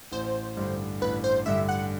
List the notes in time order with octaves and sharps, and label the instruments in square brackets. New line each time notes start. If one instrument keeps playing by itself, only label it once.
[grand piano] A1 [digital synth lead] C5
[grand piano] G2 D3
[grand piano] A1 [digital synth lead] B4
[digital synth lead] C5
[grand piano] G2 D3 [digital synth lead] E5
[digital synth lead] F#5